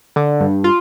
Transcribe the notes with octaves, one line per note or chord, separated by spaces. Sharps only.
D3
G2
F4